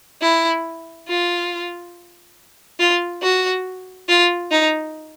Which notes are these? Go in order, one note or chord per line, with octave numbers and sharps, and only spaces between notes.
E4
F4
F4
F#4
F4
D#4